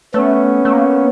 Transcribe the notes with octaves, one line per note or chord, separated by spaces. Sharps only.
A3 B3 C#4
A3
A#3